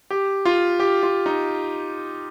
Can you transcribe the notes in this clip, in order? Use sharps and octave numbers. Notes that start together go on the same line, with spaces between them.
G4
F4
G4
F4
D#4